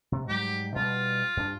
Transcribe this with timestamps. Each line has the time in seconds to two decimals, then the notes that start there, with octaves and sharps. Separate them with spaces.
0.12 C3
0.29 G#2 F#3 G3 G4
0.76 B2 G3 F4
1.37 G2 D4